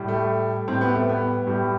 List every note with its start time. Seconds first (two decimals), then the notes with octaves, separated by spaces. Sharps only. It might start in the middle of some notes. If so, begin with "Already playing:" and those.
Already playing: A2 G3
0.08 A3
0.67 A2 G3 C4
0.81 B3
0.95 A3
1.09 B3
1.47 A2 G3